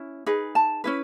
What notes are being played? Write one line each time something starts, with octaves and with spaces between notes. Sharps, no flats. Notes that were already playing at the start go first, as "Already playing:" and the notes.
Already playing: C#4 E4
D#4 G#4 B4
A5
C#4 E4 B4